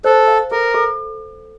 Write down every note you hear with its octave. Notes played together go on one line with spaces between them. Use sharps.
A4 C5
F5
A4 A#4
A4